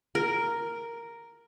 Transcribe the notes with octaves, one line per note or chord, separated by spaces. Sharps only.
A#4